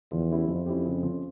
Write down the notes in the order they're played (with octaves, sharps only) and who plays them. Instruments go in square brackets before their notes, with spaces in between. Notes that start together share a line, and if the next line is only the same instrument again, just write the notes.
[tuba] E2 [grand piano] F3
[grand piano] C#4 E4 G4
[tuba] F2 [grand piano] F3
[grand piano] C#4 E4 G4
C#3
F3 C#4